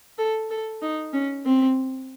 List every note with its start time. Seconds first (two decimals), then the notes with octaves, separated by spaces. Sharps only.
0.18 A4
0.50 A4
0.82 D#4
1.13 C#4
1.45 C4